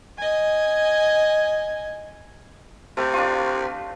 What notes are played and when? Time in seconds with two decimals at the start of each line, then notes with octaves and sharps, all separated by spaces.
0.18 D#5 G#5
2.97 C3 A3
3.13 D4 F4